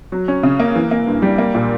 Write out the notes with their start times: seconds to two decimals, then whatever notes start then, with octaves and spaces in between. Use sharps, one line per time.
0.12 F#3
0.28 C#4
0.43 C#3
0.59 A#3
0.75 E3
0.91 A#3
1.07 G2
1.22 G3
1.38 A#3
1.55 A#2